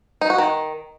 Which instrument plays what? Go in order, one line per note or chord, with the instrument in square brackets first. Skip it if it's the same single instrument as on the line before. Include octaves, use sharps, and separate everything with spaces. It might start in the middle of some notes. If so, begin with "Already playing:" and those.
[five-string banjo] D#4
F#4
D#3